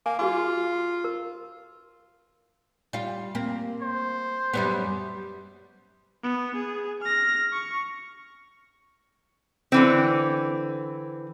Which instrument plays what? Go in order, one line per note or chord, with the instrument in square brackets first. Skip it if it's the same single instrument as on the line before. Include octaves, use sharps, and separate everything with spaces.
[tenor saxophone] A#3 [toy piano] G#5
[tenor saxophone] F4 [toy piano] F#4 G#4 D6
[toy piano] A#4
[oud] G3 F4
A#3 C4
[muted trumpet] C5
[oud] F#2 G3 B3
[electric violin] B3
G#4
F6 A#6
C#6
[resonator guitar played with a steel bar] D3 E3 C4